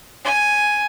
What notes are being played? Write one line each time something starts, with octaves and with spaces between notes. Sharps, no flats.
G#5